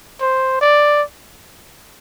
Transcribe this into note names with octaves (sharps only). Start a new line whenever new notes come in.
C5
D5